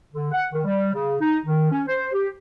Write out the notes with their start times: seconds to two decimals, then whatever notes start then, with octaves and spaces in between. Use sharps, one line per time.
0.13 D3
0.32 F#5
0.52 D#3
0.64 G3
0.93 C#3
1.21 D#4
1.45 D#3
1.70 C#4
1.88 C5
2.12 G4